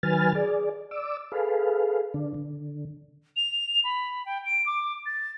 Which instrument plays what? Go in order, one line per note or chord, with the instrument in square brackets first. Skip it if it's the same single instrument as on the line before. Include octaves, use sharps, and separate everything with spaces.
[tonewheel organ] D#3 F#3 B4 G#5 F6 A6
G#4 D5
D5 D6 E6
G#4 A4 B4 F5
D3 D4
D3
[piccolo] F7
B5
G5
D7
D6
A6